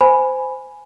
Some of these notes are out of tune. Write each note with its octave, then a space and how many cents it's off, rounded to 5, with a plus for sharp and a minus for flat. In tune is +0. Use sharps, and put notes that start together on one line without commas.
C5 -15 G#5 +0 B5 +0